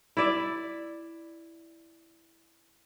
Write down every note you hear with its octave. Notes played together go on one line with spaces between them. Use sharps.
E4 D5 E5